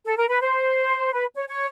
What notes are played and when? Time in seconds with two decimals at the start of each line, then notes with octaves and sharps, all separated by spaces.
0.05 A4
0.16 A#4
0.28 B4
0.40 C5
1.12 B4
1.35 C#5
1.47 C#5